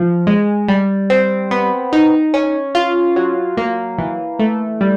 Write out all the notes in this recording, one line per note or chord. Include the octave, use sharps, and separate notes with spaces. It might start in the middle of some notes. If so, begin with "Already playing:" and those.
Already playing: F3
G#3
G3
C4
B3
D#4
C#4
F4
F#3
A#3
E3
A3
G3